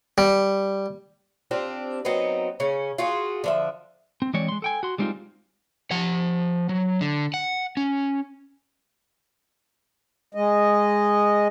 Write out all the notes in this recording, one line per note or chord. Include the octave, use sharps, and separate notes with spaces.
G3
C4 D4 F4 G4
F#3 B3 C4 D#4
C#3 C#4
F4 F#4 G#4
D3 F3 E5
C4
E3 G#3 C4 C#5 D5
G#3 C6
A4 G5 G#5
F#4 C6
G3 G#3 C4 D4 D#4 F4
F3 F#5
F#3
D3
F#5
C#4
G#3 D#5